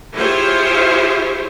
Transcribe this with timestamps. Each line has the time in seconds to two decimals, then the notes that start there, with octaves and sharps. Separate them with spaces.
0.16 E4 F4 G4 G#4 C5 C#5